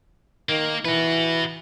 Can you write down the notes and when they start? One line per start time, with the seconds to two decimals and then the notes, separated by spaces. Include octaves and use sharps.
0.49 D#3 A#3
0.85 E3 F#4 B4